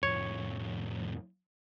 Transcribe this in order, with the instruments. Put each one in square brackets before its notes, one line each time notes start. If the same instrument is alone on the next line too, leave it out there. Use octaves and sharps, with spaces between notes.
[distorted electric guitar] F2 A2 [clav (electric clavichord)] C#5